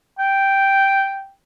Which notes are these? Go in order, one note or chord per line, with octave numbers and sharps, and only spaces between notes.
G5